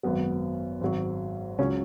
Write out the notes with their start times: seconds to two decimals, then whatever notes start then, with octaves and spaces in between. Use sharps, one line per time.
0.03 G#1 F#2 F#3 B3
0.81 G#1 G#2 F#3
1.58 C#2 C#3 F#3 C#4